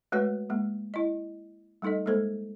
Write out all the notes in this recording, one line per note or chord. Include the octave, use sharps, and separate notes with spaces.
G#3 A3 F#4 B4 C#5 F#5
G#3 A#3
E4 D#5
G3 A3 D#4 A4 D#5
G#3 A#3 A4 C5